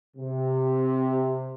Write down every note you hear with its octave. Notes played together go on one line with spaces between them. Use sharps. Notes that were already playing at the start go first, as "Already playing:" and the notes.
C3